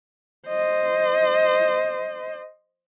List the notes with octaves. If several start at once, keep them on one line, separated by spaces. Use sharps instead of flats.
C5 D#5